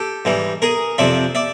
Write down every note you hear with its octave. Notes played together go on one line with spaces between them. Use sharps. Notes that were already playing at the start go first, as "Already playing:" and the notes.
Already playing: G4 A4
G#2 E3 G3
G#4 A#4
F2 C3 F3 D5 E5
D5 E5